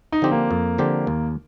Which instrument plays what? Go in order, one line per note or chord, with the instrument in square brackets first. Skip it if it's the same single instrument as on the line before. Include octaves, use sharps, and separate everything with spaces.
[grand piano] D#4
[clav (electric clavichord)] D3 F3 C4 G4
[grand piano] A#3
[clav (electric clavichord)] F2
D3 F3 C4 G4
D#2